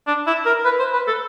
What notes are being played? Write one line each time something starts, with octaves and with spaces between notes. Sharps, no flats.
D4
E4
A#4
B4
C5
B4
A4